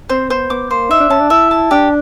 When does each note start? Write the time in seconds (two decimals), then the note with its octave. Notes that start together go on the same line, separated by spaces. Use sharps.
0.09 C4 C5
0.30 B3 C5
0.50 B3 D6
0.70 A#3 C5
0.90 D#4 E5
1.00 D4
1.10 C#4 A5
1.20 D4
1.30 E4 E5
1.51 A5
1.71 D4 G4